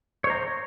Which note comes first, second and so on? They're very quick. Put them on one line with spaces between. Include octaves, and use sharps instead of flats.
C#5 C5 A#5